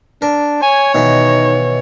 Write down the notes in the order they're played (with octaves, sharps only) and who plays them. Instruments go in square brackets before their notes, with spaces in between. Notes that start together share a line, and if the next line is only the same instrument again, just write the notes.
[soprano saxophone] D4 [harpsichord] A#4
[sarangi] C#5 [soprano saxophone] G#5
[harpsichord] B2 D#3 E3 [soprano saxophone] D#4